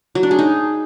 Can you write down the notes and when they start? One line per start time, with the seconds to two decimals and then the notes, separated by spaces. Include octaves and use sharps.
0.15 F#3
0.23 D4
0.31 G#4
0.39 D#4